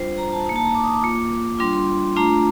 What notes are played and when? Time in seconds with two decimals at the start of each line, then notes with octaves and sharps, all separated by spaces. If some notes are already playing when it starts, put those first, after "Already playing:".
Already playing: G3 D4 F4 C5
0.18 A#5
0.32 A5
0.46 A#3 D#4 A#5
0.56 A5
0.65 A#5
0.75 D6
0.84 D#6
0.94 D6
1.02 A#3 F4
1.59 G3 D4 F4 C6
1.73 C6
2.16 A3 D4 F4 A#5